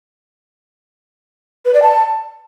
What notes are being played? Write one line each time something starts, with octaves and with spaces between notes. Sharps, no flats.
B4
D5
A5